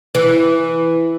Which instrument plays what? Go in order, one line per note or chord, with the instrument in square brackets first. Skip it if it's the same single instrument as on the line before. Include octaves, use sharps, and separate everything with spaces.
[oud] E3